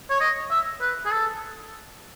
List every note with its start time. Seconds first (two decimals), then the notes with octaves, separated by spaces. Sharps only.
0.10 C#5
0.20 D#5
0.51 E5
0.81 B4
1.05 G#4
1.11 A4